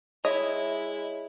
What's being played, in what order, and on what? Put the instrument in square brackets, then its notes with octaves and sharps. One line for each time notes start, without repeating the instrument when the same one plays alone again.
[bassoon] G#3 [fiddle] E4 [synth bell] C#5 E5 [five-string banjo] D#5